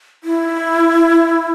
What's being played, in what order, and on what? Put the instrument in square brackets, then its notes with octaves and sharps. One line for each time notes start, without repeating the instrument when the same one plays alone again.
[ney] E4